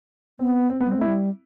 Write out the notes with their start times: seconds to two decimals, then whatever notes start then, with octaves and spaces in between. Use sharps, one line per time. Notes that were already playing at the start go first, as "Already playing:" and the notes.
0.39 B3 C4
0.70 C4
0.81 B3
0.86 G3
0.91 C4
0.97 A3 E4
1.07 G3